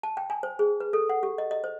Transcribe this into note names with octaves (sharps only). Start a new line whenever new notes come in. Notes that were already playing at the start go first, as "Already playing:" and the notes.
A5
G5
G#5
C5
G#4
B4
A4
F#5
G4
D#5
D#5
C5